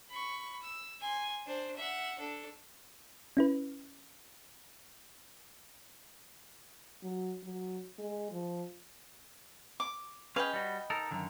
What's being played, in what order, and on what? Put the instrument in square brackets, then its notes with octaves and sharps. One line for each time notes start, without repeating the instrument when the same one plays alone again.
[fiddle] B5 C#6
E6
G#5 C6
D4 C5
E5 F#5
D4 A4
[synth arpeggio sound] C#4 E4 B4
[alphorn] F#3
F#3
G#3
F3
[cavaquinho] D6
[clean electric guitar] C#4 G#4 F5 [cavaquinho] B4 D#5 G5
[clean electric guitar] G3 F#4
D#4 A4 A#4
F#2 D3 D#3